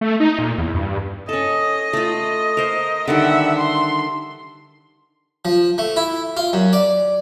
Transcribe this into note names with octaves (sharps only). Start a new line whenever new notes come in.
A3
D#4
A#2
E2
G2
C#4 A4 D#5
A3 F4
A#4 C5
D3 D#3 G3 E5 F#5
C6
F3
A3
E4
F4
F#2
D5